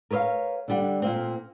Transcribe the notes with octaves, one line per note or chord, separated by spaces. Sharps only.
A#4 B4 C#5 D#5 F5
D3 G3 F#5
A#2 A#3 C4